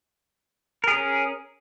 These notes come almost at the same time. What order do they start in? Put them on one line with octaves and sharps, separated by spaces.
A#4 G#4 C#4